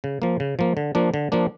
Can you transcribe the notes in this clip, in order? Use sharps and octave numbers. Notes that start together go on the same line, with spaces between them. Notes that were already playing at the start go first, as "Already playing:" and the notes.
C#3
F3 A#3
C#3
F3 A#3
D3
F3 A#3 D4
D3
F3 A#3 D4